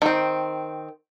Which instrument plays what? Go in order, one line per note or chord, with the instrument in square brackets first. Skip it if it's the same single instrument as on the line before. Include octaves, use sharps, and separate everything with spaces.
[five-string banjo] D#3 C4